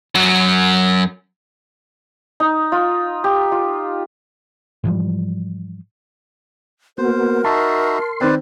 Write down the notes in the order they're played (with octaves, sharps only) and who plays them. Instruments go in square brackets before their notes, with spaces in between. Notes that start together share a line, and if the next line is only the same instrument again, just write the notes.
[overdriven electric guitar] F#2 F#3
[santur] D#4
F4
G4
F4
[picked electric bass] G#2 E3 F3 G3
[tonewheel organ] A#3 B3 F#4 [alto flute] A#4 [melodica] C5
[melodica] D#4 F#4 E5 [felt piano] A5 [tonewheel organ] C6
[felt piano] D#3 C4 [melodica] B4 C5 D5